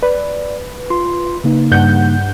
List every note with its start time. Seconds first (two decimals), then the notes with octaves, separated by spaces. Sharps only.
0.03 B4 D5
0.90 F4 C6
1.44 C#3 A#3 D#4
1.71 G2 F#5 G6